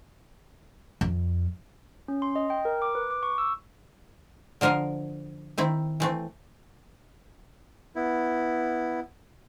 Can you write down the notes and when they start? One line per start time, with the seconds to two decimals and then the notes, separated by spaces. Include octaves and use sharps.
1.01 F2
2.08 C#4
2.22 C6
2.36 D#5
2.50 G5
2.65 A#4
2.82 D6
2.95 B4
3.11 D6
3.23 C#6
3.38 E6
4.61 D3 F3 A#4 D#5 F5
5.58 D#3 C4 E4
6.00 E3 A3 C4
7.96 B3 E4